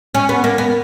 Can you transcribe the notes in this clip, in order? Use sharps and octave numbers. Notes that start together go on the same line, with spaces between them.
C#4
B3
A#3
B3